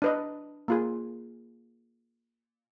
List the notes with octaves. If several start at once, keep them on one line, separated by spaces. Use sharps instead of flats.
D4 B4 D#5
A#3 F4 G#4